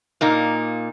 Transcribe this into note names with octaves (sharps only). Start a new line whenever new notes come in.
A#2 A#3 D#4